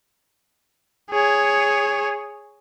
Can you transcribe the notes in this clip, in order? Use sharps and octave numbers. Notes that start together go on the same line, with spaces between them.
G#4 C#5